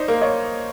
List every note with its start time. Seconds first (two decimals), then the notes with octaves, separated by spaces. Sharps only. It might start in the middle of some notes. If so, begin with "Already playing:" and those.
Already playing: D#4 C5 D5
0.08 A#3
0.21 C#5 D#5